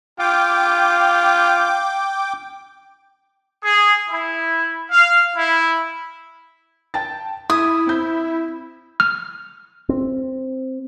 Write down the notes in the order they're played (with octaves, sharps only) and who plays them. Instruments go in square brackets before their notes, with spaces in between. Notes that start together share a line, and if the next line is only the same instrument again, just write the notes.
[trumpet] F4 [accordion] G5 D6
[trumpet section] G#4
E4
F5
E4
[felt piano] G5 A5 A6
[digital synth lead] E4 [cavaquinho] D#6 [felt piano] G#6
[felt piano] C4 G6
[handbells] F6
[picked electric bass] C4